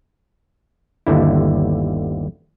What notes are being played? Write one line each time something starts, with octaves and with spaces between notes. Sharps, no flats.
G1 D#2 D3 E4